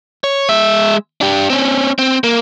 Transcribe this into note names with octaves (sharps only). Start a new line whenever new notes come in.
C#5
G#3 E5
D4 G4
C4 C#4
C4
A#3